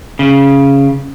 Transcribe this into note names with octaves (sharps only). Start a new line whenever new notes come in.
C#3